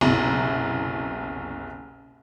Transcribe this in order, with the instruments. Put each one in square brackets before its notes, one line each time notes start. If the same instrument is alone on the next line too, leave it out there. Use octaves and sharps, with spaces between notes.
[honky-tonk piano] F#1 C2 B2 E4 A#5